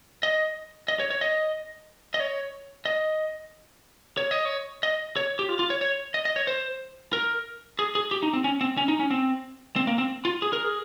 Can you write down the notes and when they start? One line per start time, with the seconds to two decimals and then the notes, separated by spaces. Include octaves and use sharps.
0.23 D#5
0.88 D#5
1.00 C#5
1.10 C#5
1.21 D#5
2.14 D#5
2.20 C#5
2.85 D#5
4.17 C#5
4.31 D#5
4.45 C#5
4.83 D#5
5.16 C#5
5.39 G4
5.49 F4
5.59 F4
5.70 C#5
5.81 C#5
6.14 D#5
6.25 D#5
6.36 C#5
6.47 C5
7.13 A#4
7.79 G#4
7.95 G#4
8.11 G4
8.23 D#4
8.33 C4
8.44 C#4
8.61 C4
8.77 C#4
8.88 D#4
8.99 C#4
9.11 C4
9.76 C4
9.87 A#3
9.98 C4
10.25 F4
10.42 G#4
10.53 A#4
10.64 G#4